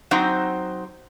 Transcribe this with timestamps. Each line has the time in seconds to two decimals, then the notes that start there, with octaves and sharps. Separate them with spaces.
0.11 F#3 C4 D#4 C5